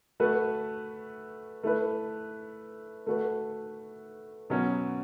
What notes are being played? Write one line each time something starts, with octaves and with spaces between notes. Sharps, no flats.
A3 F#4 B4
A3 E4 B4
A3 F#4 B4
B2 F#3 C#4